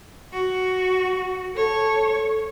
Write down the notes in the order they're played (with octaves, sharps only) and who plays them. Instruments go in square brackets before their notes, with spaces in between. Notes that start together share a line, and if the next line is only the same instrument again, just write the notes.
[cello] F#4
[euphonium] A4 [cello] C#5